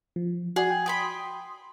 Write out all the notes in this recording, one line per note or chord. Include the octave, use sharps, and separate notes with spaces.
F3
F#4 G#4 D5 F#5
G5
G5 G#5 B5 C6 D#6